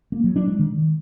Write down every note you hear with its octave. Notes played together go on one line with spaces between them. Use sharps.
A#3
F#3
D4
G#3
D#3